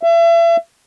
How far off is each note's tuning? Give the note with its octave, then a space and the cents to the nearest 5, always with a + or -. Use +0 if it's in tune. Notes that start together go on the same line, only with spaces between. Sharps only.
E5 +35